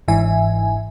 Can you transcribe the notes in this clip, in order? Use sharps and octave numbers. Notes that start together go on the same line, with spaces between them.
G1 G#2 E3 E5 G#5